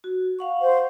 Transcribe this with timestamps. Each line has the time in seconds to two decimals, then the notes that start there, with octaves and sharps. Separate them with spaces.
0.04 F#4
0.39 F5 F#5 C#6
0.62 C5